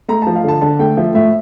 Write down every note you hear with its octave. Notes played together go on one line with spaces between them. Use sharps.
A3 A#5
F3 A5
F5
D3 A5
D3 A5
A3 G5
F3 E5
A2 E5